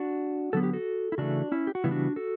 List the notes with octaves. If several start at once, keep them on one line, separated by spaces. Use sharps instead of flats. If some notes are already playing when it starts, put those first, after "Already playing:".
Already playing: D4 F#4
D3 F#3 B3 A4
G4
F#4 A4
E4
C#3 E3 A3 D4 F#4
C#4 E4
G4
F#4
C#3 E3 G3 B3 E4
D4 F#4
F#4 A4